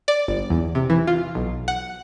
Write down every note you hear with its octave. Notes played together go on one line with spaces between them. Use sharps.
D5
G1
E2
C3
E3
F4
B1
F#5